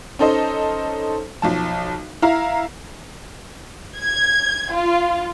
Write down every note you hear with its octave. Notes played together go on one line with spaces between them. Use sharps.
C#4 D#4 A4 C5 D#5
B1 F3 A5
E4 F5 A#5
G#6
F4